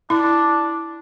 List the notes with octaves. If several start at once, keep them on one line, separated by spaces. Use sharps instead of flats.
D4 E4